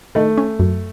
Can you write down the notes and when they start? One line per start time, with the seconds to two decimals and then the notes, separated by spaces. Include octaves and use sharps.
0.15 D#3 A3
0.38 C#4
0.60 F#2